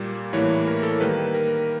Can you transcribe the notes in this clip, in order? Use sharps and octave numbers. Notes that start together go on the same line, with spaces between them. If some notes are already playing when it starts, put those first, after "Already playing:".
Already playing: A#2 G3 A#3
A2 E3 G3 A#3 C#5
A#4
A4
D#3 G3 A#3 B4
A#4